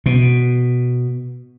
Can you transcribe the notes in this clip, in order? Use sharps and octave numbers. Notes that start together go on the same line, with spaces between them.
B2